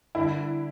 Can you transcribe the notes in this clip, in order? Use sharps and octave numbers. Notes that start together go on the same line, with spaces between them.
D3 G3 D4 E4